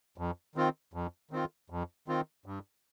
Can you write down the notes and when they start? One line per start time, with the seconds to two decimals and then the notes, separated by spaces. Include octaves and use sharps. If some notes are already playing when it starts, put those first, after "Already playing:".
0.18 F2
0.56 D#3 C4 F4
0.94 F2
1.31 D#3 C4 F4
1.70 F2
2.08 D#3 C4 F4
2.46 G2